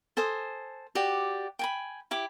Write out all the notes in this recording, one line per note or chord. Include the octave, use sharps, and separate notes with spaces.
A4 C5 G#5 D#6
F#4 G4 D5
G5 G#5 B5
E4 G4 D6